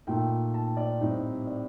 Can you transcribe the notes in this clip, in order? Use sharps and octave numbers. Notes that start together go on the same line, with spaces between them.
A#2 A3 D#4 G5
A5
D5
A2 G3 C4 D#4 D#5
D5